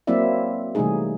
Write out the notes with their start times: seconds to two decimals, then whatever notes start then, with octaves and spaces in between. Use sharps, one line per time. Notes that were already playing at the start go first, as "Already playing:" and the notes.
0.07 F#3 A#3 C4 E4 D5 E5
0.75 C3 E3 G3 A3 D#4 G#4